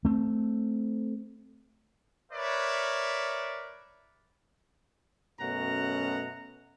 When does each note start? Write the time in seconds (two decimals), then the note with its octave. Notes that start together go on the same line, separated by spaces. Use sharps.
0.05 A3 C4
2.32 A#4 B4 C#5 D5 E5
5.40 F#2 B2 A3 C#4 F#5 A#5